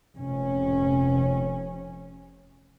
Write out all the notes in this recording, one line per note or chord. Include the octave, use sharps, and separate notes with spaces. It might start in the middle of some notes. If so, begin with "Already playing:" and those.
F1 C#4